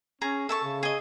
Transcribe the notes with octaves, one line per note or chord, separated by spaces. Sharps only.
C#4 G#4 A#5
A4 E5 A5 C#6
C#3
G#4 D#5